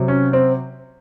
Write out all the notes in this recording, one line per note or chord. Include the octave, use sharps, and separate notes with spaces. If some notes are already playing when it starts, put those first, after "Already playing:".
Already playing: C3 F#3
C#4
C4